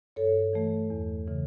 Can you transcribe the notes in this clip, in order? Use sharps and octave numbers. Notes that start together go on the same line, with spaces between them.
G2 A4 C#5
E3 A3
E2
C#3 E3